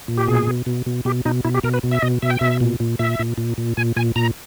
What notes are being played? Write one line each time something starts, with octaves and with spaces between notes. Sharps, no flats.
A#2
G4
B2 G#4
B2
B2
B2
B2 G4
B2 D#4
B2 E4
G4
B2 A#4
B4
B2
E5
B2 D#5
B2 E5
G5
B2 E5
A#2
A#2
A#2 E5
A#2
A#2
A#2
A#2 G#5
A#2 G#5
A#2 A#5